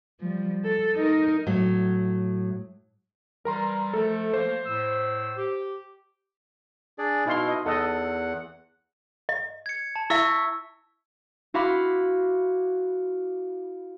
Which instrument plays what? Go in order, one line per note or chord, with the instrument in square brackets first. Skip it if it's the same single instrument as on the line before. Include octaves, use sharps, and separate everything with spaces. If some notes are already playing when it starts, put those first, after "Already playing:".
[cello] F3 G3
A4
D#4 A#4
[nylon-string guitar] A2 F#3
[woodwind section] E3 G3 [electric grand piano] A#4 A#5 C6
[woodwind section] F3 A3 [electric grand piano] A4
[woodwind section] F3 A3 A#3 [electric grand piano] C5
[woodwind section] A2 E6
G4
[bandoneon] D4 G#4 D5
[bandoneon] B2 E4 [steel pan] D#4 F5 C6
[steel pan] D#5
[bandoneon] E2 F#5 [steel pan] A4 D#5
[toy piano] D#5
[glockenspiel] G#6 C#7
A5
[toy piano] E4 E5 [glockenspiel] C#6 E6 B6
[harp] E4 F#4 F5 B5 C6 D6